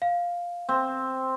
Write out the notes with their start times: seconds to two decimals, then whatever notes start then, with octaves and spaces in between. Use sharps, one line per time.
0.02 F5
0.69 C4